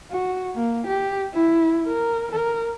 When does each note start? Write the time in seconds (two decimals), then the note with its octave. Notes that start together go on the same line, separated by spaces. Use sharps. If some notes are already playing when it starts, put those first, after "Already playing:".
0.11 F#4
0.56 A#3
0.87 G4
1.34 E4
1.87 A#4
2.32 A#4